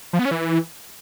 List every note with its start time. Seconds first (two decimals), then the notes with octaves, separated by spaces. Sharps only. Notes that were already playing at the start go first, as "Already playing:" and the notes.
0.13 F3
0.19 B3
0.25 C#4
0.31 E3